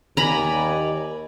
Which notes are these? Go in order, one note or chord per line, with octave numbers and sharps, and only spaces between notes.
D#2 D5 G#5 A#5 B5